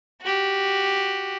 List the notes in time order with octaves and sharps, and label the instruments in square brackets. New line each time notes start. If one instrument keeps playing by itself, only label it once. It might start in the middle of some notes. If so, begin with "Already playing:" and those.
[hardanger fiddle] F#4 G4